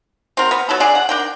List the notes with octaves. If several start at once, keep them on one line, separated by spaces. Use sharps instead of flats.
C4 F#4 A#4
B3
F#3 A3 A4
D4 G#4 D5
F#5
D4 A#4 G5